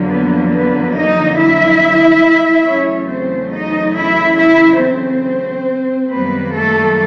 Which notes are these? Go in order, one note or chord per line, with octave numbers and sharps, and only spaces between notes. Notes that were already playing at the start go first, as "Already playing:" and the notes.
Already playing: F2 D3 F#3 A#3
B3 B4
B3 B4
D#4 D#5
E4 E5
E2 C#3 F#3 A3 C#4 C#5
C4 C5
D#4 D#5
E4 E5
E4 E5
C4 C5
F#2 D#3 G3 A#3 B3 B4
A3 A4